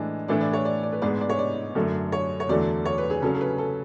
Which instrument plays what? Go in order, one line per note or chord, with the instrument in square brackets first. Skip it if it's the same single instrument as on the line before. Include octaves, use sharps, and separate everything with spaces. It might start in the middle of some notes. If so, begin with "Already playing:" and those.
Already playing: [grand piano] A2 E3 G#3 D4
[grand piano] A2 E3 A3 D4 [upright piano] D5
[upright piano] D5
C#5
D5
D5
B4
[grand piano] G#2 G#3 B3 [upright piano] D5
[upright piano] D5
C#5
D5
[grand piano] F#2 D3 A3
[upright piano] C#5
C#5
[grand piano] E2 D3 F#3 A3 [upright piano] D5
[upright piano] C#5
B4
G#4
[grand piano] C#3 F#3 C#4 [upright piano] A4
[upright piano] A4
B4
A4